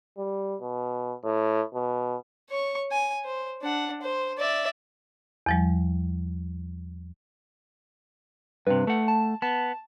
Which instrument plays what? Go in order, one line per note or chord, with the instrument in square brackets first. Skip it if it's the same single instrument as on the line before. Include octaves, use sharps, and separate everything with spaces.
[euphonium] G3
B2
A2
B2
[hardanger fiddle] C#5 C#6
G#5
C5
D4 F#5
C5
D5 E5
[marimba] E2 F3 G3
[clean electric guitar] G2 C3 [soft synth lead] B4
[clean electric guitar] A3 F#5
[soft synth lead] A5
[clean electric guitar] B3 [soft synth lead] A5